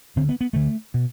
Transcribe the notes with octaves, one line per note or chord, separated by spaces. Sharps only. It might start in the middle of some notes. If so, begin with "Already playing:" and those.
D2 D3 C4
B3
B3
D2 D3 A3
B2